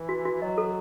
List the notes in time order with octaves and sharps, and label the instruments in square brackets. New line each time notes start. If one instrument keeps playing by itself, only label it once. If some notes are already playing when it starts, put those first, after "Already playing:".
Already playing: [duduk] E3
[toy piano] F#4
F#4
[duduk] F#3 [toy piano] D#5
[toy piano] A4